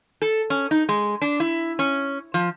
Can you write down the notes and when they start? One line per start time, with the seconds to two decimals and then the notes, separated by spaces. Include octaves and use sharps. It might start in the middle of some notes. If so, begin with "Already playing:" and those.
0.22 A4
0.50 C#4
0.71 D#4
0.89 G#3
1.22 D4
1.40 E4
1.79 C#4
2.34 F3